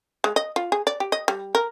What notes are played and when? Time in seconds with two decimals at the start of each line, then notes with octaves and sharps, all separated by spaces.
0.24 G#3
0.36 D#5
0.56 F4
0.72 G#4
0.87 D5
1.00 G4
1.12 D#5
1.28 G3
1.55 A#4